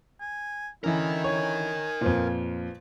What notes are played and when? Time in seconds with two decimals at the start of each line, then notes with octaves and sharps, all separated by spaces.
0.20 G#5
0.84 D3 E3 C#4 E4 A#4 D#5
1.24 C#5 G#5
2.01 F2 A#2 F4 B4 C5